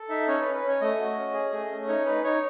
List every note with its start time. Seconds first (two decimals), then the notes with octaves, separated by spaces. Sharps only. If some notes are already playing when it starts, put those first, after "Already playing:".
Already playing: A4
0.09 D#4 E5
0.28 C#4 C#5
0.40 B4
0.46 C#4
0.54 B4
0.63 C#4
0.68 C#5
0.81 A3 D#5
0.98 F#4
1.17 C#4
1.34 G#4
1.52 A3
1.71 C#4
1.88 D#4 C#5
2.06 D#4 B4
2.24 D#4 C#5